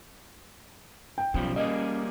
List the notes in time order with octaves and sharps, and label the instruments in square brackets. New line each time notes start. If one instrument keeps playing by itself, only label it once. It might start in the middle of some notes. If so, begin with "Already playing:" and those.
[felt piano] G5
[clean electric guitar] B1 F3 G3 [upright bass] C#4
[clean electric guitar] G3 A#3 G#4 [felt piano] D#5